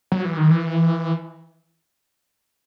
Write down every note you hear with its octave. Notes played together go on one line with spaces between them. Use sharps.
F#3
E3
D#3
E3